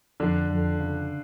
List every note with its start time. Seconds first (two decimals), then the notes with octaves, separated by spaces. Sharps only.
0.20 F2 D3 D4
0.49 F2
0.79 C#3